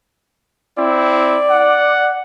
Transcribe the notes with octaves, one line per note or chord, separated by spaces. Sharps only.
C4 E4 D5
F#5